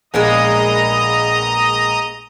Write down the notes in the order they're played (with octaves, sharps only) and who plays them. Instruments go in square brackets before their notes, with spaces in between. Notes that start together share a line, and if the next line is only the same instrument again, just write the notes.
[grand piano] A#1 [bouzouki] G#3 A#3 B3 [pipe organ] D#5 A#5 D#6